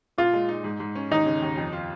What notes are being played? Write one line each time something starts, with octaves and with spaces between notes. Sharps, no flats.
A#2 F4
G#3
D#4
G#2
G#2
C#4
D#2 D#4
C#3
D#2
F2
F4